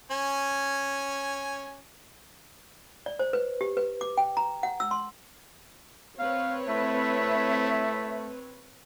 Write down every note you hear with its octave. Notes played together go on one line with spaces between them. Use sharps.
C#4 G#5
D5
C5
B4
G4
B4
D6
G5
A#5
F#5
E6
C6
C4 B4 C#5 F5
A3 E4 E5